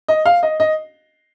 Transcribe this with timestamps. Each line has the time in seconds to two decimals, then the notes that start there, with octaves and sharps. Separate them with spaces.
0.08 D#5
0.26 F5
0.43 D#5
0.60 D#5